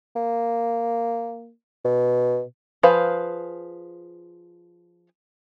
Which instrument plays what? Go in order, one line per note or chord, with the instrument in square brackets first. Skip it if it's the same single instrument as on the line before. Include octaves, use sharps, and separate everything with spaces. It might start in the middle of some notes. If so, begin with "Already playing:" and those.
[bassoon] A#3
B2
[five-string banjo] F3 G#4 B4 C5 F5